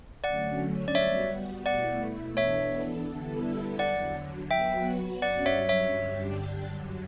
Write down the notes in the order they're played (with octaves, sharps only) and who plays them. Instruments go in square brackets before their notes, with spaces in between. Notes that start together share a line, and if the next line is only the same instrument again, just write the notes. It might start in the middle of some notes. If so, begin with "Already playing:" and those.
[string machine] D3 F#3 A3 C#4 [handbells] D5 F#5
[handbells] D5
[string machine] G3 B3 F#4 [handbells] C#5 E5
[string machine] B2 A3 E4 [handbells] D5 F#5
[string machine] E3 B3 D4 A4 [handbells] C#5 E5
[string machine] D3 G3 B3 E4 A4
[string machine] E2 D3 F#3 [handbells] D5 F#5
[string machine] F#3 B3 F#4 B4 [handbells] E5 G5
[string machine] G2 F#3 C#4 [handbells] D5 F#5
[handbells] C#5 E5
C#5 E5
[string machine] G2 D3 G3 D4 G4
F#2 D3 F#3